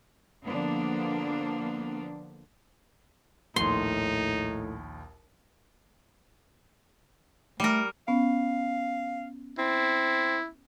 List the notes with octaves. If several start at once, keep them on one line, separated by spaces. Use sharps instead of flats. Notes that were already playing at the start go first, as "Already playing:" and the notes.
D3 F3 A#3 B3 D4
A#1 D#2 A2 D#4 C6
G3 A3 A#4
B3 C#4 F5
C4 E4